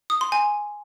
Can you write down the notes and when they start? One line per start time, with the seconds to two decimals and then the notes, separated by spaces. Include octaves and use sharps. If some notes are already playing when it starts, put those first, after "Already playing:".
0.10 D#6
0.21 C6
0.32 G#5